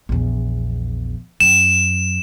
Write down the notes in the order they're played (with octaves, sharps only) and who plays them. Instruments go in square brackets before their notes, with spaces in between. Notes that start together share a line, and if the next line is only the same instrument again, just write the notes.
[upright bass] A#1 E2
[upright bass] F#2 [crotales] E7